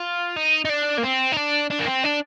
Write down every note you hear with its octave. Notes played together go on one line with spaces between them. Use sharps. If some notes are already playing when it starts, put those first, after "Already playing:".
Already playing: F4
D#4
D#4
D4
A#3
C4
D#4
D4
D4
A#3
C4
D4